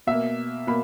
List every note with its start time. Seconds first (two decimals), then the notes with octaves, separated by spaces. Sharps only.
0.07 B2 A#3 E5
0.67 B2 A#3 B5